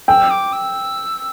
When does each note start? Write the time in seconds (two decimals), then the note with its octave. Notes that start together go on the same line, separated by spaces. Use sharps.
0.08 G5 E6
0.30 D6
0.53 E6